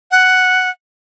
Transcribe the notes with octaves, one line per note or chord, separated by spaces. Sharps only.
F#5